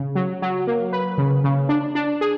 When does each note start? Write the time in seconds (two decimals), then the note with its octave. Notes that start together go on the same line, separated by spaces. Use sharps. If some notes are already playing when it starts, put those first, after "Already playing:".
Already playing: C#3
0.15 F#3
0.42 F#3
0.67 A#3
0.93 B4
1.18 C#3
1.44 C#3
1.69 D4
1.95 D4
2.21 G#4